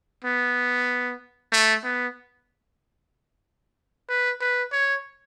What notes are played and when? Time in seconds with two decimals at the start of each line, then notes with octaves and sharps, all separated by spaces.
0.24 B3
1.52 A3
1.84 B3
4.09 B4
4.41 B4
4.72 C#5